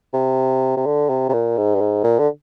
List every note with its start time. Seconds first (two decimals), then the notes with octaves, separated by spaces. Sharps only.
0.14 C3
0.77 C3
0.86 D3
1.09 C3
1.29 C3
1.33 A#2
1.57 G#2
1.75 G2
1.81 G#2
2.04 A#2
2.19 D3